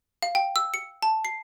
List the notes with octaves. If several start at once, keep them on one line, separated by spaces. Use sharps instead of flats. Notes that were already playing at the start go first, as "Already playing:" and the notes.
F5
G5
E6
C#7
A5
C7